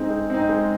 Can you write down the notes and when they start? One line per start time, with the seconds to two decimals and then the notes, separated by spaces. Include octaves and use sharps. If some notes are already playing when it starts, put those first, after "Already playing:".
Already playing: G#3 C4 D#4
0.10 G#3
0.30 C4 D#4
0.49 G#3